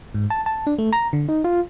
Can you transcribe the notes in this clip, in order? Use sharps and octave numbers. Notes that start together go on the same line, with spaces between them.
G#2
A5
A5
D4
A3
A#5
D3
D#4
F4